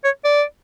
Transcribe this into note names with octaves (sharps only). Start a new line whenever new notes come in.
C#5
D5